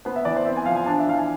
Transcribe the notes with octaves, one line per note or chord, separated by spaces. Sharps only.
B3 C5
E5
E3 D5
C5
C4 E5
G#5
F3 F5
G#5
D4 A5
E5
E3 F5
G#5